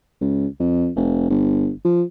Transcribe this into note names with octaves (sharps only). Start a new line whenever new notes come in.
C#2
F2
F1
G1
F3